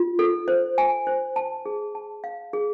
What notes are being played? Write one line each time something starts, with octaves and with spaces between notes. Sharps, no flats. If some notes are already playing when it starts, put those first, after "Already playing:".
Already playing: F4
A4
C5
G#5
C5
A5
G#4
A5
F5
G#4